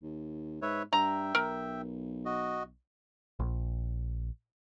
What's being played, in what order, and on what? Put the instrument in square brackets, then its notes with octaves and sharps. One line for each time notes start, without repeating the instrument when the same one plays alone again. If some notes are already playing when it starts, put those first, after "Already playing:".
[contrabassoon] D#2
[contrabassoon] G#2 [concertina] B4 C#5 E5
[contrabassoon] G2 [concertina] E5 G5 [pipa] A#5
[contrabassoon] B1 [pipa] A#4
[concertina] F#4 D#5
[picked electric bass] A#1